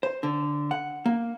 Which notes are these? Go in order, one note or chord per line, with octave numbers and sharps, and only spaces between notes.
C5
D3
F#5
A#3